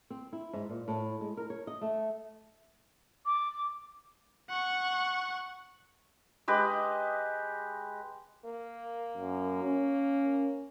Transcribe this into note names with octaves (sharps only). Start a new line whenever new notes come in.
C4
E4
G#2
A#2
A2
G#3
A#4
C#5
D#5
A3
D6
F#5 C#6
G#3 G4 B4 D#5
A#3
F#2
C#4